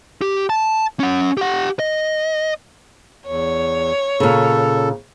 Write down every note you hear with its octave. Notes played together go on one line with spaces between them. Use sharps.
G4
A5
C#4 F#5
G4 F#5
D#5
E2 C#5
A#2 C#3 A4